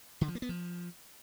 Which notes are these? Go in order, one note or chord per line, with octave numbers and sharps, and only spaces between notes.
D3
F3
A#3
B3
F3